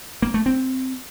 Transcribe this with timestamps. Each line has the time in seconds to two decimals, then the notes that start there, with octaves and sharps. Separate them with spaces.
0.22 A#3
0.34 A3
0.46 C4